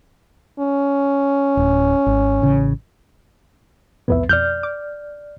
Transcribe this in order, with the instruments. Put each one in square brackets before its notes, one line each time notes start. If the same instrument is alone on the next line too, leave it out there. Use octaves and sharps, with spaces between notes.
[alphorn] C#4
[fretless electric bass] D1
G#1
A1 C#3
[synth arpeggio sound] C2 F2 A2 [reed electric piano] B3 B4 E5
[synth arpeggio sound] F2 B2 [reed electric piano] D5 F6 G6
[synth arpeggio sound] D6